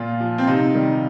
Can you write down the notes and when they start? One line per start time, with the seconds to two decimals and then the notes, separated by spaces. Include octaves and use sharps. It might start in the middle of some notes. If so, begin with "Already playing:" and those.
Already playing: A#2 F4
0.20 F3
0.38 C4
0.47 C3 D#4
0.74 D#3 G3